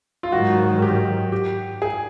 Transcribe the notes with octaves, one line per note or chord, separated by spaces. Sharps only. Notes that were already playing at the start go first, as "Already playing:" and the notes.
F4
G#2 D#3 F#3 F#4
G4
G4
G#4